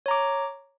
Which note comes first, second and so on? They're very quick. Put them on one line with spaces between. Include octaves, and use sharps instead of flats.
C#5 A#5 D6